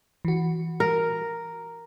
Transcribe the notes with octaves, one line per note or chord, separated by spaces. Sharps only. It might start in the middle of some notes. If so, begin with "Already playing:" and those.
E3 F#4
A#4